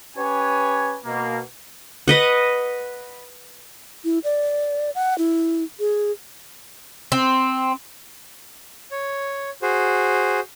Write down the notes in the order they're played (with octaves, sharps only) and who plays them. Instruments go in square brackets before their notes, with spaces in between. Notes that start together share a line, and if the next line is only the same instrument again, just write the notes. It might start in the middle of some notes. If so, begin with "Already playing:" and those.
[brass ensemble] C#4 G4 B4 C#5 G#5
B2 A#3
[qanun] B4 D#5 F#5
[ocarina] E4
D5
F#5
E4
G#4
[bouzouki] C4
[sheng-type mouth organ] C#5
F#4 G#4 C5